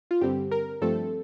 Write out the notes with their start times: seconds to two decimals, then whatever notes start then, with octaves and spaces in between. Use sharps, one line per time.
0.11 F4
0.21 G2 D3 G3 C4 G4
0.51 A#4
0.81 G2 F3 A3 C4 A4